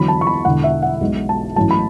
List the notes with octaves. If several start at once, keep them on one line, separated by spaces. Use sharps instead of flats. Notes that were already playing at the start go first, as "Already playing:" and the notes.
Already playing: E2 D3 F#3 B5
A5
C#6
B5
E1 E2 D3 F#5
E5
F#5
B1 B2 G#3
A5
A1 A2 F#3 A5
B5